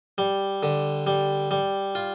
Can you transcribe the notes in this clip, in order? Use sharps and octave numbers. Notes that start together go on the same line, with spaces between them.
G3
D3
G3
G3
F4